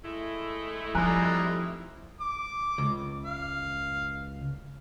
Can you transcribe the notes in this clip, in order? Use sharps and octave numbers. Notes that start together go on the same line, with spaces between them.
G#3 A3 E4
F3 G3 C4 D#4 G#5 A#5 F#6
F#6
D6
C#2
F5